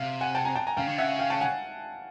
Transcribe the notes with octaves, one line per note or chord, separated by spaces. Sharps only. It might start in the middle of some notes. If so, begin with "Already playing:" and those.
Already playing: C3 F5
F#5 G#5
G5 A5
G#5 A#5
G5 A5
G#5 A#5
C#3 F5 G5
D3
C#3 E5 F#5
F5 G5
G5 A5
F#5 G#5